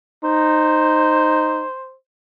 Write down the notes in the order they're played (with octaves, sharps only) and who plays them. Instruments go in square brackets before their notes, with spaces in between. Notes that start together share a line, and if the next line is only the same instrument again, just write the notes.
[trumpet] D#4 [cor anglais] C5